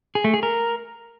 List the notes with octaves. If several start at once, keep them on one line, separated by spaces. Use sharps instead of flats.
G#4
A3
G#4
A#4